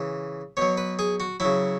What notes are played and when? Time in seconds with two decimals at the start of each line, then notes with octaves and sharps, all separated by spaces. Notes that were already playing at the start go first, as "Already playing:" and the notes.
Already playing: C#3 E3
0.57 B2 F#3 C#5
0.77 B4
0.99 G#4
1.20 F#4
1.40 C#3 F#3 E4